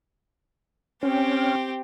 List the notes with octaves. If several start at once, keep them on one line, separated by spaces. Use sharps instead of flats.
C4 C#4 G4